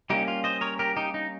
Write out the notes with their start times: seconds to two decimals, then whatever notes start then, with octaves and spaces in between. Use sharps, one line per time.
0.10 G3 A#3 C#4 D#4 G4
0.28 F4
0.44 C5 D#5
0.61 A#4 C#5
0.79 G4 A#4
0.97 D#4 G4
1.14 D#4